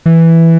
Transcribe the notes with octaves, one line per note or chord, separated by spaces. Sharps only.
E3